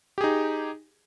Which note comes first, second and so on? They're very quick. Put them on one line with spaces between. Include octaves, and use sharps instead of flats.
G4 G#4 D#4